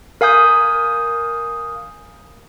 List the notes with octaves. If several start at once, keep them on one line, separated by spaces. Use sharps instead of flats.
A#4 F5 G#5 D#6 G6